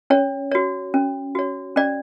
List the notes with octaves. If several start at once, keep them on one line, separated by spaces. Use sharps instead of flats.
C#4 C#5
F#4 C#5
C#4
F#4 C#5
C#4 D5